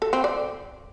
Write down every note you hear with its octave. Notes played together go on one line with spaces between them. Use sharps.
A4
C4
D5